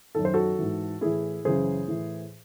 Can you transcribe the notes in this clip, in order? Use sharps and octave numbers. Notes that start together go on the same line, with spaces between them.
F#2 D#3 A4
C5
F#4 A4
G#2 E3
A2 E3 E4 G#4
F#2 C#3 E3 G#4 C5
A2 E3